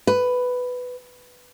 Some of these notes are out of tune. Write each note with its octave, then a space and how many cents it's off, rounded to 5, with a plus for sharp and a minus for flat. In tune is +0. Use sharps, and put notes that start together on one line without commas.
B4 +10